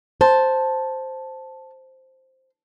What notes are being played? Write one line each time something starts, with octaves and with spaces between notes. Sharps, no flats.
C5 A5